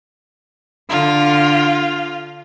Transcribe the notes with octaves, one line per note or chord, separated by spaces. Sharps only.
D3 F4